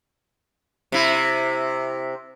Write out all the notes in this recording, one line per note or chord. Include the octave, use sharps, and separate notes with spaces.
C3 E4